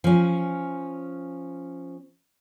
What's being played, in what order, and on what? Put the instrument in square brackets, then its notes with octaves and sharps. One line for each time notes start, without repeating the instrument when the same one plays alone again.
[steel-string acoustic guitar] F3 C#4